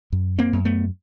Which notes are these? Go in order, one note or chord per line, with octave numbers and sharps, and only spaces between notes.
F#2
A#3 C4
F#2
A3 B3